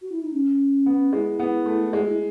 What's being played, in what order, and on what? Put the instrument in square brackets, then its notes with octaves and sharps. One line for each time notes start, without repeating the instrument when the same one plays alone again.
[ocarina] F#4
E4
D#4
C#4
[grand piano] B3
[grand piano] G#3 [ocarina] E4
[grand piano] B3
A3
[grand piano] G#3 [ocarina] G#4
[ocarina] F#4
E4